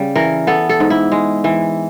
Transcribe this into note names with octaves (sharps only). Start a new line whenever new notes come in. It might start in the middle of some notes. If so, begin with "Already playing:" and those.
Already playing: C#3 G3
E3 A#4
B3 A4
A4
G#2
E4
G#3
E3